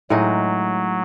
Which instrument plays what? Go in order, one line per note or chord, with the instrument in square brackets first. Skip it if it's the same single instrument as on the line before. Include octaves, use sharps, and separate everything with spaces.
[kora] A2 G#3 D#4 [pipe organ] F#3